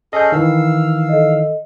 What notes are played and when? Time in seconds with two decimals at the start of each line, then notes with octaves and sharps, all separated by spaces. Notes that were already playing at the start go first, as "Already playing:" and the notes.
0.13 C#4 G#4 A4 D#5 G6
0.32 D#3 E3 F5 E6
1.09 A4 D#5